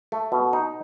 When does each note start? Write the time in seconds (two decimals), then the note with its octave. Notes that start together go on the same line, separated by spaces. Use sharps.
0.12 A3
0.32 B2
0.53 D#4